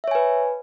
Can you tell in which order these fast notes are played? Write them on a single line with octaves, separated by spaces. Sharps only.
E5 C#5 G#5 B4